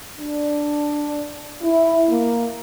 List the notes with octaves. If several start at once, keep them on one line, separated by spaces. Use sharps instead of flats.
D4
E4
A#3